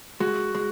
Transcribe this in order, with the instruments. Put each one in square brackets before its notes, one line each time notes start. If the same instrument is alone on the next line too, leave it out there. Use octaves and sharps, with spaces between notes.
[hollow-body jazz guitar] G#3 [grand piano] F#4
[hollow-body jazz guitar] G#3